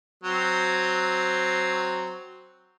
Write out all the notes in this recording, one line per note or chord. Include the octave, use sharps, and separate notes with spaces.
F#3 C4